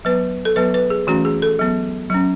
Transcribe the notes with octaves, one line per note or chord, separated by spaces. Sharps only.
F#3 B3 B4
A4
F#3 B3 B4
B4
G#4
E3 A3 C#4 F#4
G#4
A4
F#3 B3
F#3 C#4